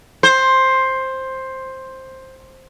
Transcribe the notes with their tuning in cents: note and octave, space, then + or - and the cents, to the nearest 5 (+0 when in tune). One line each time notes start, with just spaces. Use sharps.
C5 +10